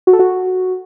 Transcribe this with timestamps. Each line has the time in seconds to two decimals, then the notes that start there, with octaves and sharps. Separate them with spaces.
0.07 F#4
0.13 A4
0.19 F#4